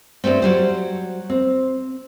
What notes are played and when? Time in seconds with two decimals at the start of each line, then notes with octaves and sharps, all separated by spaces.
0.24 G2 E3 G3 A3 C4
0.42 F#3 G3 C5
1.30 C4